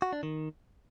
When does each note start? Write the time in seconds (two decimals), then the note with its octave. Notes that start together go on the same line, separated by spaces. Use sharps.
0.02 F#4
0.13 D4
0.23 D#3